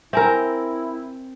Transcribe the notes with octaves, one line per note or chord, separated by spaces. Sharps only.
C4 E4 A#4 E5 G#5